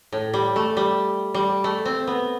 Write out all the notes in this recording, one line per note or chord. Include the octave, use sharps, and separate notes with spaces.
A2
G3
A3
G3
G3
A3
C4
B3